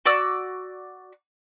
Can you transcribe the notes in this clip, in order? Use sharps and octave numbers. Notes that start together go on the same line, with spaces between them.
F#4 D5 D6 E6